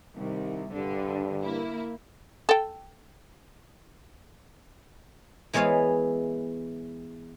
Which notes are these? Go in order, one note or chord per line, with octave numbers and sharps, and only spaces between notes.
C2 D#3
G2 D3
A#3 E4
A4 G5
E3 G#3 B3 C#5 F5